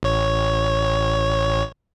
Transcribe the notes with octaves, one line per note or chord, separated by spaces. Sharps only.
A1 C#5